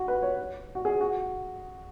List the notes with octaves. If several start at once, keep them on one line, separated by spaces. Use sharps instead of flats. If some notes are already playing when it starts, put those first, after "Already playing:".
Already playing: F#4
B4
C#5
F#4
G#4
F#4